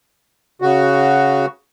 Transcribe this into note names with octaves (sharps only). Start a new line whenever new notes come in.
C#3 F#4